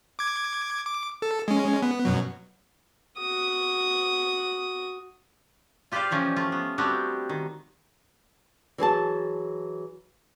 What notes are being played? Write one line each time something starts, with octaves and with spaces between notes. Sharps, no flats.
D6 G#6
D6
A4
G#3 C#4
B3
F#2 B2 F#3
F#4 D#6
F4 G4 B4 C5 D5 F5
A#2 E3 F3 C#4
A3 F4
B3
G3 B3 C4 D4 F#4 G4
D#3
E3 F#3 G#4 A5